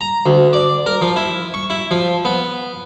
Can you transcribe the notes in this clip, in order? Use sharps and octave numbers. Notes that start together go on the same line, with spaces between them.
A#5
D2
D5
A#4
F3
E4
C#6
E4
F3
B3